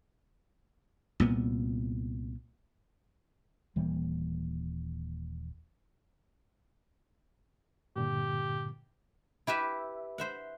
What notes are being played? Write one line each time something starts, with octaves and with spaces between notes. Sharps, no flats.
C2 A#2 B3
D#1 E3 G3 A#3
G2 A#2 D3 G4
E4 G4 B4 E5
C5 E5 F#5